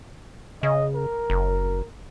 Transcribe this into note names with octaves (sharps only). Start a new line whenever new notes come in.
C#3 D#5
A#4
F#1